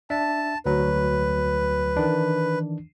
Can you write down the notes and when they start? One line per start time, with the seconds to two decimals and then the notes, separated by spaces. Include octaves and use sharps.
0.10 D4 E5 A5
0.66 D2 F#3 B4
1.97 D#3 E3 D4